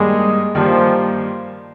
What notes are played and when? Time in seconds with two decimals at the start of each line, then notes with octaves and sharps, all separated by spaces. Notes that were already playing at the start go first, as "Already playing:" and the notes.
Already playing: G2 D#3 G3 G#3 A#3
0.55 G2 D#3 F3 G3 A#3